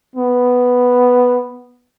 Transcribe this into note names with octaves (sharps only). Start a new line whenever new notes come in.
B3